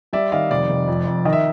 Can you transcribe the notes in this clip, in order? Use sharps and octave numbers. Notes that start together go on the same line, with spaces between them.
G3 D5 E5
D#3 D#5 F5
F1 D5
F1
F2
F2
D#3 D#5
E5